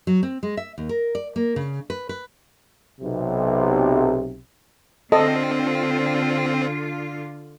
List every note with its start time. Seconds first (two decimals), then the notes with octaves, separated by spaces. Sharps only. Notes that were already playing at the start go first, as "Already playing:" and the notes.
0.07 F#3
0.23 C4
0.43 G#3
0.57 E5
0.78 D#2
0.89 A#4
1.15 D5
1.36 A#3
1.56 C#3
1.90 B4
2.09 B4
3.01 B1 C3
5.12 D3 C4 F4 A4 D#5